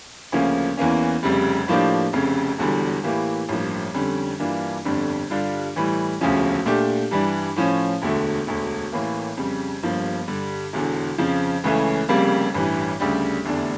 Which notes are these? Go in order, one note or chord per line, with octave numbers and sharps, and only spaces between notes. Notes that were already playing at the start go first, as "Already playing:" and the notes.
D2 C#3 F3 A#3 C#4
E2 E3 A#3 C#4
F1 F2 C#3 G3
A2 F3 A#3 D4 G4
F1 F2 C#3
E1 E2 D3 G3
A2 E3 A#3 E4 G4
A1 G2 F3 A#3
F2 D3 G3 C#4
G2 E3 A#3 D4 F4
G1 F2 D3 G3 D4
G2 D3 G3 D4 F4
A2 E3 G3
E1 D2 C#3 F3 C#4
A#2 A3 D4 G4
G2 E3 G3 D4
A2 F3 C#4
E1 D2 D3 A3
E1 D2 D3
A1 A2 E3 A#3
F2 C#3 G3
G1 G2 F3 A#3
G2 D3 G3
E1 E2 D3
F2 C#3 F3
C#2 C#3 E3 A3 C#4
F1 F2 C#3 G3 A#3
A1 G2 E3
D2 C#3 G3 D4 G4
F1 E2 D3 A3 D4